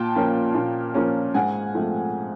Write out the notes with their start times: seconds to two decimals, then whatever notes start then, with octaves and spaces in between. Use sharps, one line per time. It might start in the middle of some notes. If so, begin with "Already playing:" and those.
Already playing: A#2 G5 A5
0.16 F3 A#3 C#4
0.55 A#2
0.94 F3 A#3 C#4
1.34 G#2 F#5 G#5
1.75 F3 A3 C4